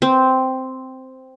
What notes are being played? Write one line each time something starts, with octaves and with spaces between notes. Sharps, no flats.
C4